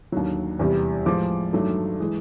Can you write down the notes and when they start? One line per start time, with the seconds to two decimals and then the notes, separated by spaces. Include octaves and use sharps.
0.12 D#2 D3 F#3
0.59 E2 C3 E3 G3
1.06 A2 F3 G#3 D6
1.53 G2 D#3 F#3 A3
2.00 E3 G#3